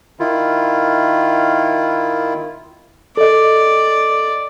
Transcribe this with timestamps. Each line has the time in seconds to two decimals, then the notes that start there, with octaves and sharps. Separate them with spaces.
0.20 D#3 E4 F4
3.17 A4 D5 D#5